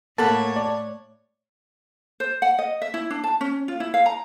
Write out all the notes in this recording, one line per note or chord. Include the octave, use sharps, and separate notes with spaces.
A2 A#3 A4 C#5 F#5 A5 B5
D5
C5
F#5
D#5
E5
E4
D4
A5
C#4
F4
E4
F5
A#5